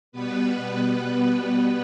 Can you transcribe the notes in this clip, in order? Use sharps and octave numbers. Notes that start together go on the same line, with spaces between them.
B2 G3 B3 B4
B4
B4
B4